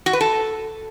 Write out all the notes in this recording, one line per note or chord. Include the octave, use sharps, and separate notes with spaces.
F#4
B4
A4